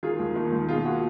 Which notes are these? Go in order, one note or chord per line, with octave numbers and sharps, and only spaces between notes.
D#3 F4 G#4
D#2
D#3
D#2
B2 F4 G#4
F#4